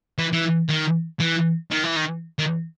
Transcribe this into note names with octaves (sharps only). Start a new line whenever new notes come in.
E3
E3
D#3
E3
D#3
E3
D#3
D#3